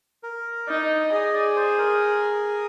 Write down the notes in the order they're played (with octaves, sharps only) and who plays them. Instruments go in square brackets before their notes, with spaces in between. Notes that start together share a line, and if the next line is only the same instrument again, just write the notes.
[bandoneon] A#4
[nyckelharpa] D#4 [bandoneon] D5
[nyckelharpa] G#4 [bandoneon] D#5
[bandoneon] D5
C5
A#4